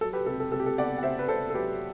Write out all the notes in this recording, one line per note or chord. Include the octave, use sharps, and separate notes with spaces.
F#3 A4
G4 B4
C3 A4
A4
C3 A4
G4
A4
B3 D5 F#5
F#5
C3 C5 E5
B4
C3 A4 C5
A4
F#3 G4 B4